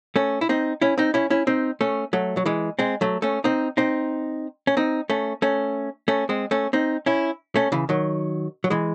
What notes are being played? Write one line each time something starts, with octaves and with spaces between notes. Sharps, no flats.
A3 C#4
E4
C4 D#4
C#4 E4
C4 D#4
C#4 E4
C#4 E4
C4 D#4
A3 C#4
F#3 A3
F#3
E3 G#3
G#3 C4
F#3 A3
A3 C#4
C4 D#4
C4 D#4
C#4
C4 D#4
A3 C#4
A3 C#4
A3 C#4
G#3 C4
A3 C#4
C4 D#4
C#4 E4
A3 C#4
C#3 E3
D#3 F#3
F#3
E3 G#3